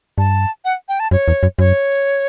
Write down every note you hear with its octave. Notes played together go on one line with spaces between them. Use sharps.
G2 A5
F#5
G5
A5
F#2 C#5
E2
F#2
F#2 C#5